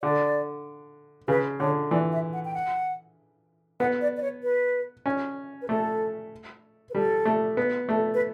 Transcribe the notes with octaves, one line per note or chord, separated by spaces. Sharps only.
D3 D5
C#3 B4
D3 C#5
E3 D5
E5
F#5
G5
F#5
B3 F#5
D5
D5
C#5
B4
C#4
B4
A3 A4
B4
G3 A4
A3
B3
A3
B4